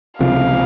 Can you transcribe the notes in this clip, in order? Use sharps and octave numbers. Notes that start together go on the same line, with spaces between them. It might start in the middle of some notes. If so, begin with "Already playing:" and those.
C#2 C3 F3 F5